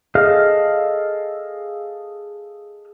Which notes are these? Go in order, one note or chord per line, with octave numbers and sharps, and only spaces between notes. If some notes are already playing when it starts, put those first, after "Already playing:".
G#4 A4 D#5 F5 F6